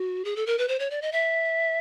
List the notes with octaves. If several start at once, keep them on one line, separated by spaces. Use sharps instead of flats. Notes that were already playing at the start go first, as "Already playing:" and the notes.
Already playing: F#4
G#4
A4
A#4
B4
C5
C#5
D5
D#5
E5